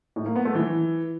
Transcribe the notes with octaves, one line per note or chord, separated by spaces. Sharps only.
A2
A#3
B3
A3
E3